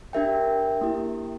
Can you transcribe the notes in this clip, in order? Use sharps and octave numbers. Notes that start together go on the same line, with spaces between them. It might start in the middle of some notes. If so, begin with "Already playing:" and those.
D4 G4 A#4 E5 G5
A#3 E4 G4